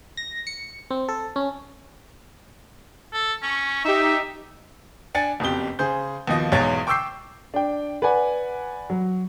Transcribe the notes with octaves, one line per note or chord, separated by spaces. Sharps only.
A#6
C#7
C4
A4
C#4
A4
C#4 C#6
D#4 G4 E5
D4 G#5 A6 C#7
F#1 F2 B2 G4 G7
C#3 G#4 C5 G6
D#2 B2 F3 D#5
B1 E2 G#2 G#3 C#5 A6
G5 C#6 D6 E6 G6 C7
D4 G5
B4 D5 F#5 G#5
F#3